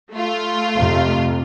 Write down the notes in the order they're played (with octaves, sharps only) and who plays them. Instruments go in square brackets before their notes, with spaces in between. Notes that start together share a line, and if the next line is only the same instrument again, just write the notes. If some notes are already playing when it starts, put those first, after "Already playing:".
[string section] A3 F4
[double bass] F2 C3